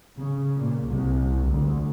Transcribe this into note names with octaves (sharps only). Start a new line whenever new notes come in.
C#3
A#2
C2
D2